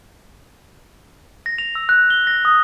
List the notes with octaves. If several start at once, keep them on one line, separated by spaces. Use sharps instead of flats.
A#6
F7
E6
F#6
G7
A#6
D#6